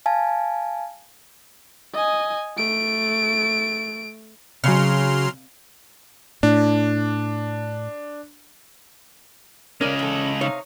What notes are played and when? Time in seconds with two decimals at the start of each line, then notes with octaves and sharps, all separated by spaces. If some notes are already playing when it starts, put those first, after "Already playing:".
0.06 F5 G#5 A5
1.94 D#5 G#5
2.57 A3 D7
4.64 C#3 F#3 C6 F6
6.43 A2 D4
9.81 C#3 G#3 C#4 A#4 D5
9.99 E2 A4
10.41 C3 D#4 C#5 F5